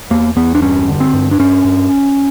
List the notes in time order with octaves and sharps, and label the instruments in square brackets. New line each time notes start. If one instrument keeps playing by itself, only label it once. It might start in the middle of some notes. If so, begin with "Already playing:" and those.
[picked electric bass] E2 A#3
E2 B3
D4
G2 C#4
D3
C4
G2
D4
G2 C#4
G2